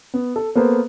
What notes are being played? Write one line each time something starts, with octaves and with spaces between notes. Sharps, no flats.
B3
A4
A#3 B3 A4 B4 C5